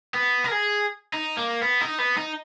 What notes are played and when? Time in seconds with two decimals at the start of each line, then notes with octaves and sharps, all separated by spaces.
0.14 B3
0.44 A#4
0.51 G#4
1.13 D#4
1.37 A#3
1.62 B3
1.81 D#4
1.99 B3
2.17 D#4